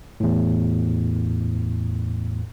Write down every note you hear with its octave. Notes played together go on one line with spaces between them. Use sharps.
E2 A2